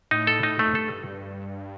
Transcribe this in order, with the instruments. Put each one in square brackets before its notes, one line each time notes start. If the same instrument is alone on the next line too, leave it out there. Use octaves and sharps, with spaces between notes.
[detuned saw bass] A2 [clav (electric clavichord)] D#4
[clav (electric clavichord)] A4
D#4
A3
[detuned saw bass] F2
[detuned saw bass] G2 [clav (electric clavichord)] A4